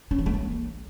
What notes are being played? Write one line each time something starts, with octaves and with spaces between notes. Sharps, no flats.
C#4
E3
A3
A#3